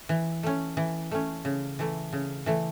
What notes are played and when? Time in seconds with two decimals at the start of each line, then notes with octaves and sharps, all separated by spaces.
0.09 E3
0.43 A3 C#4
0.77 E3
1.11 A3 C#4
1.45 C#3
1.79 E3 A3
2.13 C#3
2.46 E3 A3